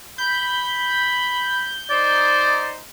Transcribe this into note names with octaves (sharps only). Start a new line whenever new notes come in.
B5 G6
D#4 C5 D5